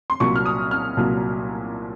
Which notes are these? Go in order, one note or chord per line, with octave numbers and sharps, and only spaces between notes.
C6
C2 A#2 F#3 C#6
F6
D#6
F6
C2 A#2 F#3